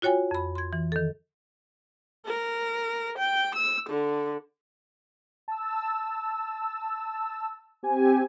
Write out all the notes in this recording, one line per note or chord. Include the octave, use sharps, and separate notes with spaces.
F4 F#4 C#5 G5 G#5
F2 B5
C6 G#6
E3
D#3 A4
A#4
G5
E6
D3
A5 E6
C4 G4 G#5